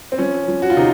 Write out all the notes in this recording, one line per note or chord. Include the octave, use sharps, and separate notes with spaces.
C4
F3 C#4
F3
F#4
F4
C3 D#4